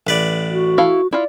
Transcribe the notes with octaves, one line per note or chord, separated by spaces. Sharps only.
A1 B4 D5
F#4
E4 A4 F5
E4 F4 D5